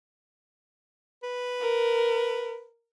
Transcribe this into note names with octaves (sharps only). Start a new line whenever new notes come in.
B4
A#4